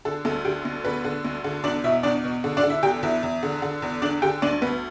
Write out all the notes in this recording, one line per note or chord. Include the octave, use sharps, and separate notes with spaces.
D3 A4
D2 A4
D3 G4
D2
D3 B3 B4
D3
D2
D3
E2 D4 D5
B2 E4 E5
E2 D4 D5
B2
D3
D4 D5
D3
E4 E5
E2 G4 G5
E2 E4 E5
E2
D3
D3
E2
D3 D4 D5
D3 G4 G5
D2 D4 D5
D2 B3 B4